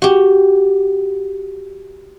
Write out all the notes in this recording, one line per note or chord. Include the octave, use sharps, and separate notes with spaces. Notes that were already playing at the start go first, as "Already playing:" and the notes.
F#4 G4